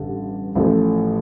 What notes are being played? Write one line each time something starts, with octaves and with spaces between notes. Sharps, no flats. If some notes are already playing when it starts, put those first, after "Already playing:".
Already playing: A1 G2 D3
A1 A2 F3 A3